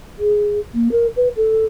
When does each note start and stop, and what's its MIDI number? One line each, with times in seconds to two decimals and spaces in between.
0.19 0.60 68
0.74 0.88 58
0.92 1.07 70
1.16 1.28 71
1.36 1.65 69